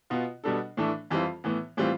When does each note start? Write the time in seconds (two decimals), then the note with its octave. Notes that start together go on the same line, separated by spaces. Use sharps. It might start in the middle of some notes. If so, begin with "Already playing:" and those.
0.10 B2 B3 F4
0.44 B2 G3 B3 D4 A4
0.77 A2 E3 A3 D4
1.10 F2 E3 G3 C4 F4
1.44 A2 E3 B3
1.77 A2 E3 G3 C4 F4